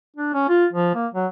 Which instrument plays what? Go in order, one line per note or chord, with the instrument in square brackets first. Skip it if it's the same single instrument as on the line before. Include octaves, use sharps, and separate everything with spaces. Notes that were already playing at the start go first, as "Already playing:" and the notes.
[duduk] D4
C#4
F4
F3
A#3
F#3